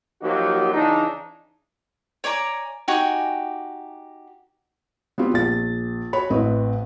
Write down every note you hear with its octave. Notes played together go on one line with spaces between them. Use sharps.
F3 F#3 A#3 D#4 F#4 G4
C#3 E3 D4 D#4
C#5 D5 G#5 A#5
D#4 F#4 G4 G#5
B3 C4 F4 G4
A#1 A6
F#4 C#5 B5
A1 C4 B4 D#5